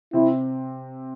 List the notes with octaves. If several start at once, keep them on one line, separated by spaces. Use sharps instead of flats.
C3 C4 E4